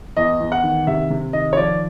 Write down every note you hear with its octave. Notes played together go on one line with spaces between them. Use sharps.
E2 D#5
E2
F#5
D#3
C3 E5
C3
D#3 D#5
C#5
F3 D5